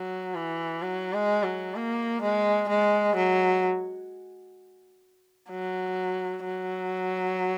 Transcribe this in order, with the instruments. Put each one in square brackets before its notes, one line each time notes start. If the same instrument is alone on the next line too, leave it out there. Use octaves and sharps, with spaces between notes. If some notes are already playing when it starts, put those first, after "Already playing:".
Already playing: [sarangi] F#3
E3
F#3
G#3
F#3
A#3
G#3
G#3
F#3
F#3
F#3